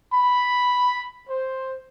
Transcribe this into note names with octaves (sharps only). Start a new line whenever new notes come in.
B5
C5